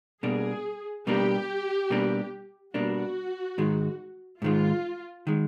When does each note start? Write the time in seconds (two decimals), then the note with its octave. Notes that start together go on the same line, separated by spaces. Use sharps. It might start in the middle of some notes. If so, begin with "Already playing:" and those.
0.23 B2 G3 A#3 D4 G#4
1.07 B2 G3 A#3 D4 G4
1.90 B2 G3 A#3 D4
2.74 B2 G3 A#3 D4 F#4
3.58 G#2 D#3 G#3
4.42 G#2 D#3 G#3 F4
5.27 D#3 G#3